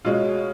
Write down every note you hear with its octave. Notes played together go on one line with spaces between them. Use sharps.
B2 G#3 C#4 F4